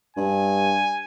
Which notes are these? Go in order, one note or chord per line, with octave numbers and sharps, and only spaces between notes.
G2 G#5